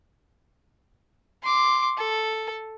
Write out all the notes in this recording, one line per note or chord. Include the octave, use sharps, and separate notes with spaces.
C6 D6
A4